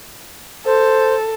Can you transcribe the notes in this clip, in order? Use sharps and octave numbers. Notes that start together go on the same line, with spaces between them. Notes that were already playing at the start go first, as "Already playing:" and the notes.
A4 C5